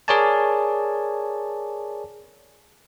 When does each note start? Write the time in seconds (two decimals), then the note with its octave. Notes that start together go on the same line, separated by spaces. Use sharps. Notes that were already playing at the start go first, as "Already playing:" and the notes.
0.08 G#4 A#4 C#5 D5 G#5 A5